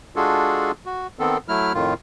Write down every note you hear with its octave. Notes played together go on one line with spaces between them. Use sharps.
G#3 D4 F4 F#4 G#4 A4
F#4
D#3 B3 C4 A4
F#3 A3 E4 F6
F2 A2 D#3 F4